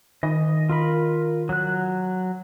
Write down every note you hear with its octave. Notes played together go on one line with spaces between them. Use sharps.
D#3 D#5
F4 A#4 B5
F#3 F#6